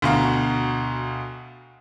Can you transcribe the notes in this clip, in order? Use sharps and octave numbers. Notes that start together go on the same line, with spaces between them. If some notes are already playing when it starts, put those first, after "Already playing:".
D2 B2 F5 A#5